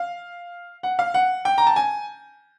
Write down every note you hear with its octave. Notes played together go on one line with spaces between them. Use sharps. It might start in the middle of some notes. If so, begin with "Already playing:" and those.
Already playing: F5
F#5
F5
F#5
G5
A#5
A5
G#5